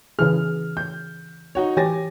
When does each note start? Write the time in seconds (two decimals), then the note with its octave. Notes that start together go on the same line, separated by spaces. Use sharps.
0.19 C#3 E3 G#4 F6
0.77 G6
1.55 D#4 F#4 C#5
1.77 E3 G4 C#5 G#5 A6 A#6